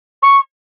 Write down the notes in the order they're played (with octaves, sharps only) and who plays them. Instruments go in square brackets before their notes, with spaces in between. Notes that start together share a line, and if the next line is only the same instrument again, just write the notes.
[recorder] C#6